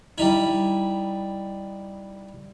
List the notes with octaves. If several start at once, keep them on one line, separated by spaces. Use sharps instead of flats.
G3 D#4 E4